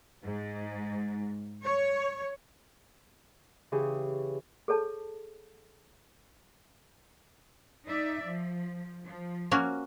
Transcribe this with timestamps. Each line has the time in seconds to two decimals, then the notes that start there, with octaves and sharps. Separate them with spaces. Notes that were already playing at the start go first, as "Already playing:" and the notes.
0.24 G#2
1.63 C#5
3.72 C#3 E3 G4 G#4
4.68 G#4 A4 C#5 A5
7.86 D#4 D5 E5
8.23 F3
9.05 F3
9.51 A#3 C#4 F#4